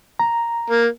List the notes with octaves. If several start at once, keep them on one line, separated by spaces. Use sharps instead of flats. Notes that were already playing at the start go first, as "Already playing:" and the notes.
A#5
A#3